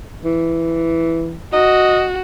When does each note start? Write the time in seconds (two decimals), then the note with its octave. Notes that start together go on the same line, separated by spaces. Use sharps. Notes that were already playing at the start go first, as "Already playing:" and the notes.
0.24 E3
1.53 F#4 D#5